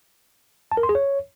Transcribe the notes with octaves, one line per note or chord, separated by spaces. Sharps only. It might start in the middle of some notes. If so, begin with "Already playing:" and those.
A5
A#4
C6
G#4
C#5